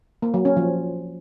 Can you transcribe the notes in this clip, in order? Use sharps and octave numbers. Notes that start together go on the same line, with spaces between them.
A#3
F#3
C#4
F3